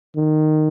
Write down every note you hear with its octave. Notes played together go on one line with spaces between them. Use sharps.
D#3